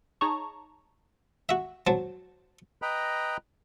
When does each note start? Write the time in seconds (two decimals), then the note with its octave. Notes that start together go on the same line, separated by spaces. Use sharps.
0.21 D#4 G#4 C#5 A5 A#5 C#6
1.49 F#4 E5
1.87 F#3 C5 A5
2.82 B4 D#5 G5 A#5 B5